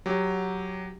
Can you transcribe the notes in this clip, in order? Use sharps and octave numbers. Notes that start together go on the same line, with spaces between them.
F#3 G4